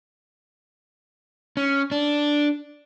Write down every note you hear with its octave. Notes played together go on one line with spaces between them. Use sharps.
C#4
D4